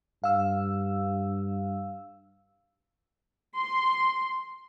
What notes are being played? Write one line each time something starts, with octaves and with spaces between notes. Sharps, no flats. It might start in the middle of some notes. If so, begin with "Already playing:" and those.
G2 F5 E6
C6